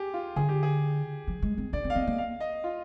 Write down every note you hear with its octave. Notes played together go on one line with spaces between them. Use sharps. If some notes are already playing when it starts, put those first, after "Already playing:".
Already playing: G4 G#4
F4
D3 G#4
G4
G#4
F3
G#3
C4
D4 D5
C4
F5
C4 D#5
A#3
F5
D#5
F4